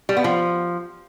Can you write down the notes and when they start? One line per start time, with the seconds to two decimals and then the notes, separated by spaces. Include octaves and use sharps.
0.09 G3
0.17 B3
0.24 F3